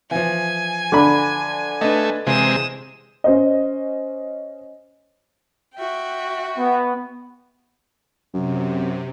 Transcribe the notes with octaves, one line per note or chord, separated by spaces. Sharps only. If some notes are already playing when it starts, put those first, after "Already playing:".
E3 F3 G#5
D3 B5
A3 D4 B4 D#5
C3 E3 G#3 C5 D#6 E7
C#4 C5 D#5
F#4 E5 G5
B3
F#2 C3